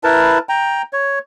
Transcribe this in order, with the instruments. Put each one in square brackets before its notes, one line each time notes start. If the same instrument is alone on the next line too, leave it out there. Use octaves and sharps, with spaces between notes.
[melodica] E4 A#4 B4 A5
G5 A#5
C#5